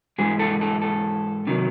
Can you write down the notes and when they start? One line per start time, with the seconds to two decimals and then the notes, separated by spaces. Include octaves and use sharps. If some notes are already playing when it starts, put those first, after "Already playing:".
0.18 G#2 E3 G#3 G#4
0.39 A4
0.61 A4
0.82 A4
1.47 C3 D#3 F#3